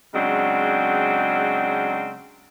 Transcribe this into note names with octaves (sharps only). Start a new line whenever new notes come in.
C#3 F#3 G#3 C4 D4